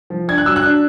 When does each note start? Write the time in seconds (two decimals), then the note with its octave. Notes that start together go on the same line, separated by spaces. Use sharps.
0.10 F3
0.28 D4 G#6
0.38 F#6
0.46 F#3 E6
0.56 F#6
0.64 D4